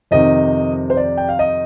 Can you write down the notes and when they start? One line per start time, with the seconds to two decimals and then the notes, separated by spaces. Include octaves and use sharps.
0.11 F2 C3 D#3 D#5
0.90 C5
0.97 D5
1.17 G5
1.29 F5
1.39 D#5